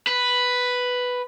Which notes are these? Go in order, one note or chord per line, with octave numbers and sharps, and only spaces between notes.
B4